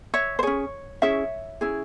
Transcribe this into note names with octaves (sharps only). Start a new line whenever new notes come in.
C#5 E5
C5
C#4 G#4 C#5
C#4 E4 G#4 C#5 E5
C#4 E4 G#4